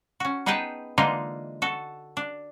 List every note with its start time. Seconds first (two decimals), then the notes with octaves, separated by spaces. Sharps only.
0.20 C#4 F#4
0.46 B3 D#4 G#4 B4 G5 A5
0.98 D3 E3 G#3 A#3 D#4 F4
1.62 F#4 A4
2.17 D4